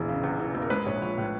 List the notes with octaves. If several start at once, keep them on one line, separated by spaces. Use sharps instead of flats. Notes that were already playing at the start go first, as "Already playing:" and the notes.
Already playing: E1 A#1 E3
C#3
E2
E3
E1
A#4
G#3 B4
A#1 C#5
F3 C#5
A2